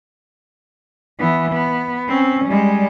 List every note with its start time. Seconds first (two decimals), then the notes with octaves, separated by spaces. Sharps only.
1.19 E3 B3
1.52 B3
2.08 C4 C#4
2.46 G3 G#3